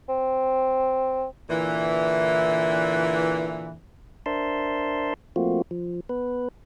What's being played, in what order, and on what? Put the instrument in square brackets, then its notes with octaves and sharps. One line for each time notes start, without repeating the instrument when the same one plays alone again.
[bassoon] C4
[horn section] A#2 D3 E3
[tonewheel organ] D4 A#4 C5 E5 A5 C6
F3 A3 A#3 C4 F4 F#4
F3
B3 B4